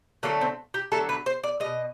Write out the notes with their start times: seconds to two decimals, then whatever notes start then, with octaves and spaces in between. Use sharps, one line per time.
0.23 D3 F#3 A3 A#3
0.41 C4
0.74 G4
0.92 D3 F#3 A3 A4
1.09 B4
1.26 C5
1.43 D5
1.60 B2 G#3 D#5